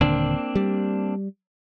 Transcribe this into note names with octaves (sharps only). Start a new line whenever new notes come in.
D#1 D3 A#3 C4 D4
G3